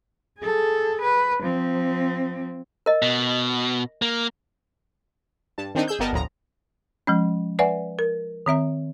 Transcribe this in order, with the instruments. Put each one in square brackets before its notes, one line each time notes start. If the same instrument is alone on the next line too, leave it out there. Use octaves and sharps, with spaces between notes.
[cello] G#4 A4
B4
F3 C4
[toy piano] A#4 D#5
[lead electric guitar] B2
A#3
[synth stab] G2 A5
D#3 C4 D4 D#4
G#4 E6 G6
G1 G3 B3 A#4 D#5 A5
G1 D2 A2 F3 A#5
[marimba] F3 G#3 C#4
B4 D5 E5 F#5 G#5
A#4
D#3 C4 E5 A#5